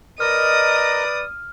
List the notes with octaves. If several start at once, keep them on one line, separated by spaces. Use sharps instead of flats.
A#4 B4 D5 D#5 D#6 F6